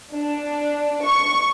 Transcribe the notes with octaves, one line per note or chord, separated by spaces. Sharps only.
D4
C#6